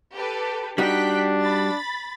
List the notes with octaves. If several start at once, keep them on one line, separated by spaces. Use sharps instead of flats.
G4 A4 B4
G3 D4 D#4 F#4 G5 F#6 B6
B5 A6